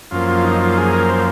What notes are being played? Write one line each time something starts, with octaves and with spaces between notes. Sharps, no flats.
F#2 F3 A#3 F4
F4
D#4
F4
G#4
A#4
C5